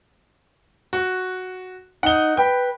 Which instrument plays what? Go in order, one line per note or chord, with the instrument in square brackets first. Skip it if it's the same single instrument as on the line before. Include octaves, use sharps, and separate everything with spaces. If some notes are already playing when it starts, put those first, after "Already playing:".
[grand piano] F#4
[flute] D#4 [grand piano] F#5 G7
[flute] B4 [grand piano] G5